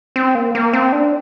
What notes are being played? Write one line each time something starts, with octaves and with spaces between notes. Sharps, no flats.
C4
A#3
A#3
C4
D4